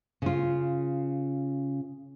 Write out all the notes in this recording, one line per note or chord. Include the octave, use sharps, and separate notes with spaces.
C#3 F4